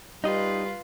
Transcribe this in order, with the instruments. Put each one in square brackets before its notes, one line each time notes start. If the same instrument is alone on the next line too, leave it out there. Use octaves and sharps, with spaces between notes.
[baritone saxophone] G3 [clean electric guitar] D#4 D#5 [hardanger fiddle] F4 B4